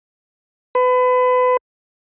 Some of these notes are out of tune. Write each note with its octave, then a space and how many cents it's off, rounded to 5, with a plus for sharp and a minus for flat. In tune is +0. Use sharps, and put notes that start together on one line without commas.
B4 +30